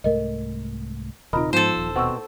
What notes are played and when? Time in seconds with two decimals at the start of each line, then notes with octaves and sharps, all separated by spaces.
0.04 C2 G#2 A3 A#4 D#5
1.33 D#1 C3 D#4 F4 A#4 D#5 B5
1.53 G#2 F3 B3 A4 C5
1.77 D#1
1.96 B2 C4 F#5 C#6 E6